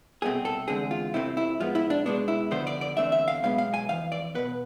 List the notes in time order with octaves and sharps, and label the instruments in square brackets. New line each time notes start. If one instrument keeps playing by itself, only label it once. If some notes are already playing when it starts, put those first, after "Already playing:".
[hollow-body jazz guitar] C2 B2 A3 C4 G#4
A4
E2 D3 G#3 C4 G#4
F4
F2 C3 F3 A3 C4 E4
E4
A2 F3 G#3 B3 F4
E4
D4
B2 G#3 B3 D4
E4
D2 D3 F3 B3 C5
D5
D5
E2 D3 A3 C4 E5
E5
F5
B1 B2 G#3 B3 F5
F5
G#5
F2 E3 F5
D5
B2 B3 B4